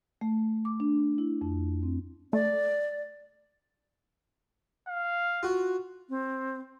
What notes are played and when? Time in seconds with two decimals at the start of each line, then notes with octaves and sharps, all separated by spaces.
0.21 A3
0.65 D6
0.80 D4
1.18 E4
1.41 F2
1.83 C4
2.33 A3 D5
4.88 F5
5.43 F4 F#4
6.09 C4